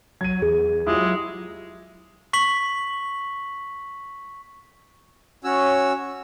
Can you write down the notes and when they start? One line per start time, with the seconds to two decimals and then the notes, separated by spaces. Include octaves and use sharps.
0.21 F#3 G#6 D#7
0.42 E2 G#4
0.87 F#3 G#3 E4 F4 G4
2.33 C#6 B6 F#7
5.44 C#4 F#4 C#5 E6